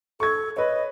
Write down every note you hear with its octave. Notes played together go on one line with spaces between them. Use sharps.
A4 C#6 G#6
B4 C#5 D#5